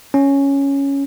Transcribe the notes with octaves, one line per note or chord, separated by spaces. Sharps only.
C#4